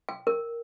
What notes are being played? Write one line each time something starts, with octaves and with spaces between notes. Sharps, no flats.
G5
A#4